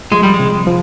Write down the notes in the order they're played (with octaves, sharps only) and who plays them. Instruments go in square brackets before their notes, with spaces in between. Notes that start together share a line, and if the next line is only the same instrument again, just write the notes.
[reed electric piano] F3 [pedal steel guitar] G#3
[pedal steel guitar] G3
G#3
[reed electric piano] C3
F3